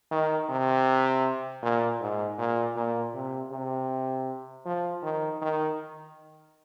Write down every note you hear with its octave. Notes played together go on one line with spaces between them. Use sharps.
D#3
C3
A#2
G#2
A#2
A#2
C3
C3
F3
D#3
D#3